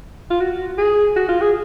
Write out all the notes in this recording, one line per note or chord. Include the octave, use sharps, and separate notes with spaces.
F4
F#4
G#4
F#4
F4
G#4